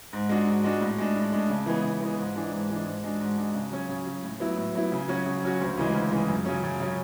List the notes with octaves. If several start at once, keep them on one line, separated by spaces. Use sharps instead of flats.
G#2
G#3 D4 F#4
G#2
G#3 D4 F#4
A2
G#3 D4
A2
G#3 D4
C#3
E3 G#3 B3
C#3
E3 G#3 B3
G#2
E3 G#3 D4
G#2
E3 G#3 D4
G#2
G#3 D4 F#4
G#2
G#3 D4 F#4
C#3
F#3 C#4
C#3
F#3 C#4
A2
F#3 B3 E4
A2
F#3 B3 E4
C#3
F#3 C#4 F#4
C#3
F#3 C#4 F#4
D2
C#3 E3 G#3
D2
C#3 E3 G#3
F#2
C#3 F#3 C#4
F#2
C#3 F#3 C#4